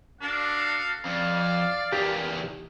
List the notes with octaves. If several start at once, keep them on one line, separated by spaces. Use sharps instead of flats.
D4 F#4 A4 F5
F2 D5 F5
E2 D#3 G4